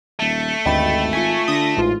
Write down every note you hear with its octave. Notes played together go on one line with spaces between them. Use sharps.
D#1 A3
G#1 D2 G2 D#5 G5 B5 A6
F4 G#5 C#6 B6
D3 D#6 A#6
A1 G#2 F4